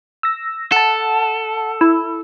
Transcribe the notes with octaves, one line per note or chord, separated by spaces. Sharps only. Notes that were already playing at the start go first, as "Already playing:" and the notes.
E6 A#6
A4 F#5 A5
E4